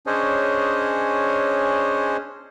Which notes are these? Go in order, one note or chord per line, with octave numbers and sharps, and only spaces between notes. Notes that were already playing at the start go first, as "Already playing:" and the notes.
C#4 D4 G#4 C5 C#5 D#5